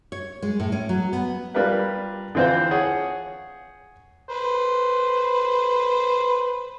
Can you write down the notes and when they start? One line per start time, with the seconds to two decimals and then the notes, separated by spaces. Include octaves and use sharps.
0.12 C#5
0.42 G#3
0.60 A2
0.72 C#4
0.89 F#3
1.13 B3
1.54 G3 D4 F4 A#4 B4
2.35 D3 E3 C4 F4 C5
2.71 G#4 C#5 F#5
4.29 B4 C5